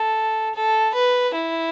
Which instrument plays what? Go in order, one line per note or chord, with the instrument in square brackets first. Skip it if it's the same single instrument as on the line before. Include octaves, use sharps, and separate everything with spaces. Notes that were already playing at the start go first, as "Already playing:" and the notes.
Already playing: [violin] A4
A4
B4
E4